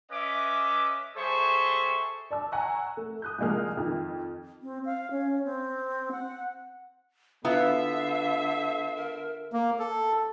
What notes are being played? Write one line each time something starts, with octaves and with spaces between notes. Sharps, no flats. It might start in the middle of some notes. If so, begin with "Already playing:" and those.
C#4 B4 D#5 E5 D6
G3 G#4 A4 C5 E5 C#6
D5 A5 E6
F#5 G#5 A#5 C#6 E6 F#6
A3
D#6 F#6 G6
C2 F3 G#3 A#3 F6
F2 D#3
C4
F5
C#4
C4
F#5
D3 B3 E4 F4 E5 F5
A#4
A#3
A4